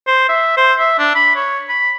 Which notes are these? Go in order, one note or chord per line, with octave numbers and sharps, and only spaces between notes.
C5
E5
C5
E5
D4
B5
C#5
B5